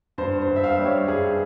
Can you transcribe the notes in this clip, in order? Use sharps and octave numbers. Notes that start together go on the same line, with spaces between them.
G2 C5
C5
G2
E5
F5
G3
C#5
G2 G#4